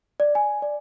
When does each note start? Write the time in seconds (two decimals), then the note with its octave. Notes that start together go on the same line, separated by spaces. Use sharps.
0.20 D5
0.35 G#5
0.62 D5